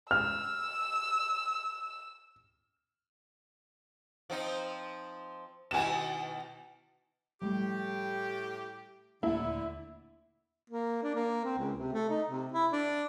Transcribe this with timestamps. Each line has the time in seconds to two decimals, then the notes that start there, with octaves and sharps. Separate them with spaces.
0.11 E6 F6
4.30 F3 C4 D#4
5.71 B2 D#3 E4 G#5 E7
7.42 A2 F3 G3 A3 G4
9.23 D#1 D3 A3 A#3 E4
10.70 A#3
11.03 D4
11.15 A#3
11.45 C4
11.58 C#2
11.79 C3
11.93 A3
12.10 D#4
12.29 C3
12.52 E4
12.72 D4